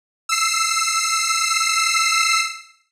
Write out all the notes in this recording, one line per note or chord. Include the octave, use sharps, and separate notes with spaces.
E6 C7